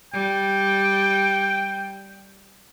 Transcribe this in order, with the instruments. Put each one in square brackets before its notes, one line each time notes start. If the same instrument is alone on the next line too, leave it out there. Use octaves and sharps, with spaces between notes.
[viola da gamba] G3 [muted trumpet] G5